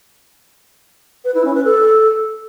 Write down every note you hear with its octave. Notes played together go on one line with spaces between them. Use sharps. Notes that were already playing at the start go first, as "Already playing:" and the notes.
B4
E4
C#4
B4
A4